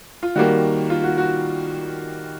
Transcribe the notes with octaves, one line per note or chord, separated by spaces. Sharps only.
F4
D#3 G3 A#3 F#4
F4
F#4
F#4